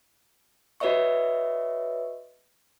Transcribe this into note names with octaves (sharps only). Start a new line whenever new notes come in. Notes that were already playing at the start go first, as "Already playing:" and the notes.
F#4 B4 C#5 D#5 E5 C#6